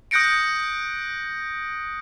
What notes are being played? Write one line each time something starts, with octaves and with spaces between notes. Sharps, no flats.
D#6 F#6 G6 A#6 C#7 D7